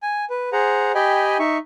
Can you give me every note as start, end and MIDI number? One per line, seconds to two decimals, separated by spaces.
0.03 0.25 80
0.30 0.50 71
0.53 0.92 68
0.53 0.92 72
0.53 0.92 78
0.53 0.92 82
0.95 1.37 67
0.95 1.37 75
0.95 1.37 79
0.95 1.37 80
0.95 1.37 83
1.39 1.58 63
1.39 1.58 76
1.39 1.58 85